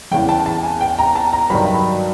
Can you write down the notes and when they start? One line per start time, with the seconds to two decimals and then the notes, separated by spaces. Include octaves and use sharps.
0.11 E2 C#3 E3 G5
0.29 A5
0.46 A5
0.63 G#5
0.81 G5
0.99 A#5
1.15 A5
1.33 A#5
1.50 G2 D#3 F#3 B5